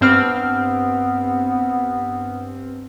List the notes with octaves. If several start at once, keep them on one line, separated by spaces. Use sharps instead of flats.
G2 B3 C4 F6